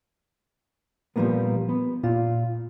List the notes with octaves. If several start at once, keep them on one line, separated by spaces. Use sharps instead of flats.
A#2 F3 G3 G#3 A#3 B3
B3
A#2 F4